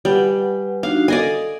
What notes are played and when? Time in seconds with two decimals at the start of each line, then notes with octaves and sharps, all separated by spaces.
0.05 G3 B4 F#5 G#5
0.83 D4 D#4 F#4 F5
1.08 A4 D5 D#5 G#5